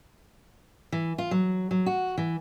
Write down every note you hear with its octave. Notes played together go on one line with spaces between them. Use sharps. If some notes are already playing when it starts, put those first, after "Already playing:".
E3
F4
F#3
F#3
F#4
E3